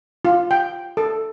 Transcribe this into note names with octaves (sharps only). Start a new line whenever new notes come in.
F4
G5
A4